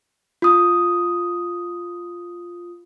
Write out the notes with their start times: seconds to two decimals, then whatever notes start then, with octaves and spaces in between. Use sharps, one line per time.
0.42 F4 D#6